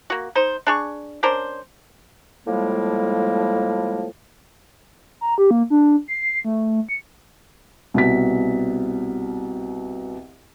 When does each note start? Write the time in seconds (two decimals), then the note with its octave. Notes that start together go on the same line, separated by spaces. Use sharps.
0.10 A#3 F#4
0.35 D#4 C5
0.67 D4 G#4 C#6
1.23 C#4 D4 A#4 C5
2.47 A2 F3 G3 G#3 A#3
5.21 A#5
5.38 G4
5.51 A#3
5.70 D4
6.08 C7
6.44 A3
6.89 C#7
7.94 C2 B2 B6